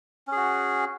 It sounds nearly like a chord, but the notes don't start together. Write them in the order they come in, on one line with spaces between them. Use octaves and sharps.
C#4 G#4 F#4